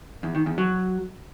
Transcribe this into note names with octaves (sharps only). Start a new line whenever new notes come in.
E2
D#3
E2
F#3